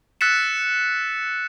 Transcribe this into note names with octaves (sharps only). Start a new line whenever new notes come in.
E6 F#6 A6 B6 C#7 E7